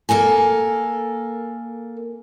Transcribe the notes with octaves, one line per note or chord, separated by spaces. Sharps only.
A#3 A4 A#4 G#5